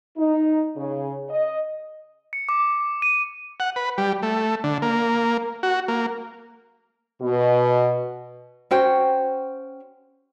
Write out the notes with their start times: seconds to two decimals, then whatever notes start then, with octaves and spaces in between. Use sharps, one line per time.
0.18 D#4
0.77 C#3
1.30 D#5
2.33 C#7
2.49 D6
3.02 D#7
3.60 F#5
3.76 B4
3.98 G3
4.23 A3
4.64 D3
4.82 A#3
5.63 F#4
5.88 A#3
7.22 B2
8.71 C#4 F#4 C5 G5